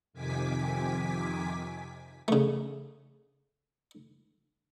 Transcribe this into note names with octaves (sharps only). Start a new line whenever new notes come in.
F2 C3 D#3 G#5 D6 B6
C#3 A3